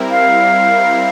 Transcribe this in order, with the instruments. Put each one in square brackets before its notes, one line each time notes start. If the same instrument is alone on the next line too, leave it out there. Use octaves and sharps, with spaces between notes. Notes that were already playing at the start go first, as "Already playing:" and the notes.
Already playing: [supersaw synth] G3 C4 E4 A#4
[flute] F5